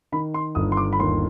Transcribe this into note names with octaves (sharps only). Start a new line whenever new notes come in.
D#3 B5
C6
G1 D#6
C6
D6
B5
D#2 C6